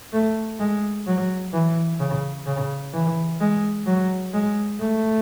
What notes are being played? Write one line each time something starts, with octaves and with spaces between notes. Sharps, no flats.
A3
G#3
F#3
E3
C#3
C#3
E3
G#3
F#3
G#3
A3